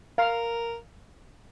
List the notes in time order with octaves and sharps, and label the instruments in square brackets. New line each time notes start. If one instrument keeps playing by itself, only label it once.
[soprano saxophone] A#4 [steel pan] F5